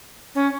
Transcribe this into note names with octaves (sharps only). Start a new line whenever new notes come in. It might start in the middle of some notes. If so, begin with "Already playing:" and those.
C#4